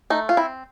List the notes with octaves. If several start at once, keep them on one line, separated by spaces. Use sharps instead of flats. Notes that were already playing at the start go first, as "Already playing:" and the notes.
A3 D#4
F4
C4 E4